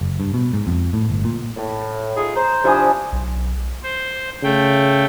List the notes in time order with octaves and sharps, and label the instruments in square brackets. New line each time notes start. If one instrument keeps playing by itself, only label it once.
[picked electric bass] F#1
G2
B2
G#2
F2
A2
G1
A#2
[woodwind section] A2
[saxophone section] D#4 F4 G#4
[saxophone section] C5 [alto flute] A#5
[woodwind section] C3 F3 D4 [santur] E4 G#5 D#6
[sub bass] B1
[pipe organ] C5
[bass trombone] C#3 [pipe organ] A3 G5